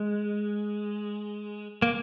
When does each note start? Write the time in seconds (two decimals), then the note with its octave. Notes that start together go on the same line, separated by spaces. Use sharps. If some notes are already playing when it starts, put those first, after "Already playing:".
Already playing: G#3
1.82 A#3